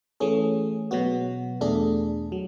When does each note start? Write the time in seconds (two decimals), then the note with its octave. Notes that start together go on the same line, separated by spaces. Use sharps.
0.20 E3 A3 C#4 G#4
0.91 B2 F#3 B3 F#4
1.61 E2 B2 A3 D4 G#4
2.32 F#3